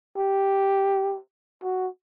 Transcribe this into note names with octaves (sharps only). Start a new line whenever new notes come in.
G4
F#4